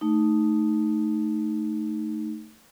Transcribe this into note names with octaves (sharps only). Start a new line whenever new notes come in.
A3 D#4